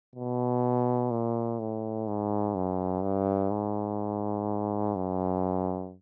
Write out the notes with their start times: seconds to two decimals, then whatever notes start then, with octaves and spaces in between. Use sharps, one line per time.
0.16 B2
1.11 A#2
1.60 A2
2.07 G#2
2.55 F#2
3.03 G2
3.51 G#2
4.96 F#2